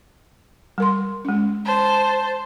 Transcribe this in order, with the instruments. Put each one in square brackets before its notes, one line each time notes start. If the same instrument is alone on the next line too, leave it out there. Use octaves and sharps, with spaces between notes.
[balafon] G3 A#4 C6
G#3 C#4
[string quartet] C5 A5